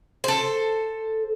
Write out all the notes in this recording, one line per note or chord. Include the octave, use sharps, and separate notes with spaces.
A4 C5